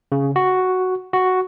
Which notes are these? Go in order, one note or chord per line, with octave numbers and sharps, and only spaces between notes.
C#3
F#4
F#4